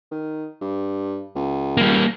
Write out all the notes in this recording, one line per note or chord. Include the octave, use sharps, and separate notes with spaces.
D#3
G2
C#2
G3 A#3